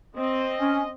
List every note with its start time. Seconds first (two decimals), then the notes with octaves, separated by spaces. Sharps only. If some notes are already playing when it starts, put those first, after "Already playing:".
0.16 C4 D#5
0.59 C#4